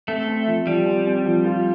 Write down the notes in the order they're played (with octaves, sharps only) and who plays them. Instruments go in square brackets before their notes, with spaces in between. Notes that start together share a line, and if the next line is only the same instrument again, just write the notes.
[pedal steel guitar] A3 [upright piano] C4
[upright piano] C4
F3
[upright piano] F3 [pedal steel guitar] G3
[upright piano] C4
C4
F3
F4